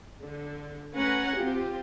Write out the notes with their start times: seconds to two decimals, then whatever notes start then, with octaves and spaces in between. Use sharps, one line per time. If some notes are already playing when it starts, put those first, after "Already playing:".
0.21 D3
0.93 A3 C#4 B4 F#5 G#5 A#5
1.34 C4 F4 G4